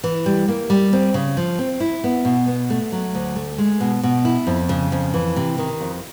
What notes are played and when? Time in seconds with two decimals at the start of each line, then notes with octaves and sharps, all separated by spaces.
0.04 E3
0.26 G3
0.48 A#3
0.70 G3
0.93 C4
1.14 C#3
1.37 F3
1.59 C4
1.80 E4
2.04 B3
2.25 B2
2.48 B3
2.70 A3
2.92 F#3
3.15 D2
3.36 A3
3.58 G#3
3.80 B2
4.03 B2
4.25 E4
4.47 F2
4.69 C#3
4.92 F2
5.14 E3
5.36 C3
5.58 D#3
5.81 F2